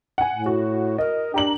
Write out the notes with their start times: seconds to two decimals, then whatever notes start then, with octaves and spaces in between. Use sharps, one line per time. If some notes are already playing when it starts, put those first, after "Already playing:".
0.18 F#5 G#5
0.33 A2
0.46 F#4
0.98 A#4 D#5
1.34 D4 G4 A#5 F#7